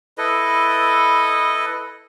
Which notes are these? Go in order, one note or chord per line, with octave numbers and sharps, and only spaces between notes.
E4 A4 B4 D#5